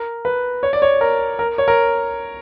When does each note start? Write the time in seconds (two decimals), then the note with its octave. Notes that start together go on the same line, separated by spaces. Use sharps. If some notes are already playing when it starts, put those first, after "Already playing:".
Already playing: A#4
0.25 B4
0.63 C#5
0.73 D5
0.82 C#5
1.01 A#4
1.39 A#4
1.58 C#5
1.68 A#4